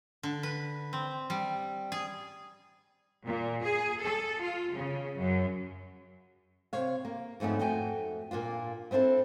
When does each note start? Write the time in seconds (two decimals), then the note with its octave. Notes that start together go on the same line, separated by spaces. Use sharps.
0.23 D3
0.43 B4
0.93 C4
1.30 G3
1.92 G#4
3.28 A#2
3.64 G#4
4.02 A4
4.42 F4
4.73 C#3
5.17 F#2
6.73 C3 C#5 F5
7.05 A#3
7.40 F2 G#2 A3 B3 C#4
7.59 F2 A3 F#4 G5 G#5
8.31 A#2 A#3 D4 F4
8.91 B3 C4 D4 E4 A4